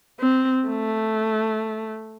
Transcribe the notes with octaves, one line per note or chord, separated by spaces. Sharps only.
C4
A3